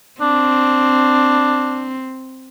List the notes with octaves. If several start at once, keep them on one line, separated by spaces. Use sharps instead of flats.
C4 D4